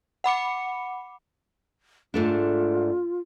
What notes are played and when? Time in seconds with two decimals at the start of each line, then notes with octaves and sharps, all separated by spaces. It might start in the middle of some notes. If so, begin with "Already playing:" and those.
0.24 F#5 B5 D6 C#7
2.14 G#2 A3 D4 F4